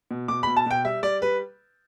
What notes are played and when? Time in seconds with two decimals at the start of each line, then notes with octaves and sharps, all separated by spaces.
0.11 B2
0.28 B2 D6
0.43 B2 B5
0.56 A5
0.66 B2 G5
0.84 G3 E5
1.03 G3 D5
1.22 G3 B4